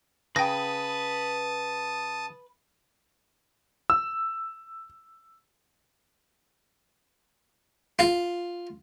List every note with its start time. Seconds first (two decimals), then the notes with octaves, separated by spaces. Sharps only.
0.36 C#3 B4 G5 A5 D#6 A#6
3.90 E6
7.99 F4